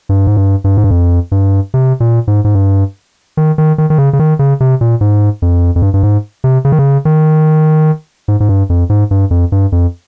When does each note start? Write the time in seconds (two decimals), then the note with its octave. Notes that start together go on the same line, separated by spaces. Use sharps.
0.09 G2
0.27 G#2
0.37 G2
0.64 G2
0.77 G#2
0.84 G2
0.91 F2
1.32 G2
1.74 C3
2.00 A#2
2.28 G#2
2.44 G#2
2.55 G2
3.37 D#3
3.58 D#3
3.78 D#3
3.90 D#3
3.98 C#3
4.13 C#3
4.19 D#3
4.39 C#3
4.60 C3
4.81 A#2
5.01 G#2
5.42 F2
5.76 F2
5.82 G2
5.94 G2
6.03 G#2
6.44 C3
6.65 C#3
6.72 D#3
6.79 C#3
7.05 D#3
8.28 G#2
8.40 G#2
8.49 G2
8.70 F2
8.90 G#2
9.11 G2
9.31 F2
9.52 G2
9.72 F2